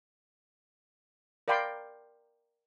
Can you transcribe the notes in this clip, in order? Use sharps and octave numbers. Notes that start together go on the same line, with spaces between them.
A#4 D5 F5 G5 B5 C6